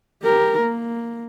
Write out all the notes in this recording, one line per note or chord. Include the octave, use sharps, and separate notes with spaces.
G4 A#4
A#3